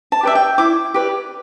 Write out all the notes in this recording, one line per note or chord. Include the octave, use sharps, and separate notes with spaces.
A5
G4 B4 D5 E5
G5
E4 D6
G4 B4 D5